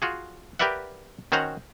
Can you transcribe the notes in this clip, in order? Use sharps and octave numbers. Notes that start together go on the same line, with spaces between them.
F4 F#4 G#4
G4 A#4 B4 D5 E5 F#5
D#3 C#4 F#4 C5 F#5 A#5